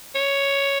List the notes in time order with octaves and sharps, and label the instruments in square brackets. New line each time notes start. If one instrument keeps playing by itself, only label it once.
[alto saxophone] C#5